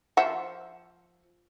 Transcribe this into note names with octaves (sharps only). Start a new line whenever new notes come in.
F3 E5 F#5